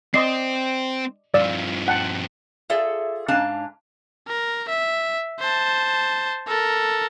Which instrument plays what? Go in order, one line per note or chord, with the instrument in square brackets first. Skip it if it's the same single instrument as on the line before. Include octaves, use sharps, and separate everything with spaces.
[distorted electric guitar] C4 [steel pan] D5 D#5 C6 [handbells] C7
[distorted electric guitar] G2 F3 [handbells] D5 [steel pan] F5 E6
[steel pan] F#5 G5 A5
[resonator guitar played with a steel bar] F4 G#4 A4 D5 E5
G#2 C#4 D4 F5 G#5 A5
[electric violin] A#4
E5
C5 A5
A4 A#4